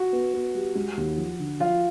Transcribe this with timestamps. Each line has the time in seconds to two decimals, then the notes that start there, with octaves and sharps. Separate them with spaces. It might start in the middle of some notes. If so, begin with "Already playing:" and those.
Already playing: F#4
0.13 B3
0.34 B3
0.55 G3
0.75 G#3
0.97 D#2
1.17 F3
1.39 D3
1.60 F3 F4